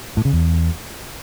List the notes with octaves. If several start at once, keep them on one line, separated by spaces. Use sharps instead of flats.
A2
C#3
E2